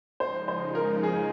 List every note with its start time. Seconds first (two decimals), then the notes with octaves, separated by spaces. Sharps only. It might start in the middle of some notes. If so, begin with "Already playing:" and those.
0.20 C#3 F3 G#3 D#4 C5
0.48 C5
0.75 A#4
1.03 G#4